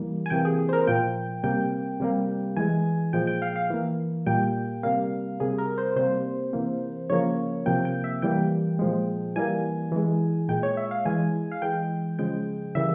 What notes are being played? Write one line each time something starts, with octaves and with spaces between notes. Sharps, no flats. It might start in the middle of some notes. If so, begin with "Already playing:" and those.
Already playing: E3 G3 A#3
G#5
C3 E3 A#3 G5
G#4
G#4
C5
A#4
A#2 F3 A#3 G5
C3 G3 A#3 G5
C3 G3 A#3
E3 G#3 G#5
A#2 F3 G#3 G5
G5
F5
F5
E3 A#3
A#2 G3 A#3 G5
C3 G3 A#3 F5
C3 G3 A#3 G#4
A#4
C5
C3 G3 A#3 C5
C3 E3 A#3
C#3 F3 A#3 C#5
C3 F3 A#3 G5
G5
E5
E3 G3 A#3 G5
A#2 F3 G#3
E3 G3 A#3 G#5
E3 G#3
A#2 G#3 G5
C#5
E5
F5
E3 G#3 G#5
F5
E3 G#3 G5
C#3 F3 G#3 G5
C#3 E3 G3 A#3 E5